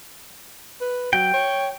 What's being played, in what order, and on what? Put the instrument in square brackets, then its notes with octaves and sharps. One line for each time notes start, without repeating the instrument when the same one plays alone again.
[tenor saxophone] B4
[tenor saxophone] F#3 [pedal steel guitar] G5
[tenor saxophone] C#5